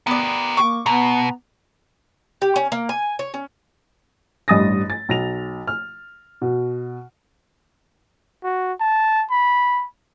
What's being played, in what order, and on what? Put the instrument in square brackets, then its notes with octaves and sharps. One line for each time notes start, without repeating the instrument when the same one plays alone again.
[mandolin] B3 D5 [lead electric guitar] G4 A#4
[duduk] A#3 [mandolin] C#6 D6
[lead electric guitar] B2 [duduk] B3 [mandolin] A#5
[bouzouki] G4
C#4
A#3
G#5
C#5
C#4
[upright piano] A1 G2 D#5 D#6 A6 A#6
A6
B1 A#6 F7
F6
B2
[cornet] F#4
A5
B5